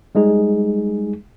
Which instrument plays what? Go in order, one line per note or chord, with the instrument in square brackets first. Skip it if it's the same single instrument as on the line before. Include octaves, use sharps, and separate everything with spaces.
[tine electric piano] G3 G#3 D#4 G#4